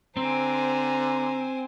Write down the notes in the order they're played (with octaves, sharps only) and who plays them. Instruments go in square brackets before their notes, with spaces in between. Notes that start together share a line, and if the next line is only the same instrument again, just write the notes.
[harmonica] D3 A#5 [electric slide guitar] C4 [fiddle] C5 G#5